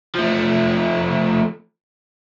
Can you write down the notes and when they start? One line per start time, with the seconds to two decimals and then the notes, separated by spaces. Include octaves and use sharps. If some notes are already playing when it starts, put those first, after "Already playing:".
0.15 F3 A3